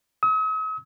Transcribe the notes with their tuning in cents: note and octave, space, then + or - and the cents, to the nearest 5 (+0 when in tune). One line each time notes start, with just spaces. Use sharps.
D#6 +45